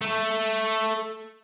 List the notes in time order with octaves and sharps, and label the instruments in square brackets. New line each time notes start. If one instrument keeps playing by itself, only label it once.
[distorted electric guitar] A3